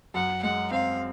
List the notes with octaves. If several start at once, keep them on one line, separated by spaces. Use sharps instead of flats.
F#2 F#5
G#3 F#5
C4 F5